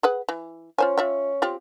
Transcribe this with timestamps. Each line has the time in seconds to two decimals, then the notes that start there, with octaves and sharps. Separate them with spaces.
0.03 G#4 B4 F#5
0.29 E3
0.78 C#4 F4 C5 G#5
0.98 F4 E5 G5
1.42 C4 F4 G4